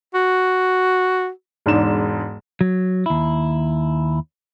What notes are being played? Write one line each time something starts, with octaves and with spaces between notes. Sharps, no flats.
F#4
E1 G#2 D4 E7
F#3
D#2 E4